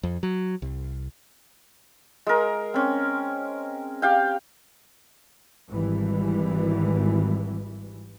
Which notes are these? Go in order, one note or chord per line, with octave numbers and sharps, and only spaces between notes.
F2
F#3
C2
G#3 A#4
C4 C#4
G4 F5 G5
G#1 E3 G3